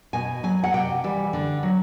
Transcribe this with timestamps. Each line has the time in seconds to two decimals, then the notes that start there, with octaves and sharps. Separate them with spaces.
0.13 B2 G#5
0.43 F#3 G#5
0.64 F#5
0.73 C3 G5
1.04 E3 G3
1.33 D3
1.63 F#3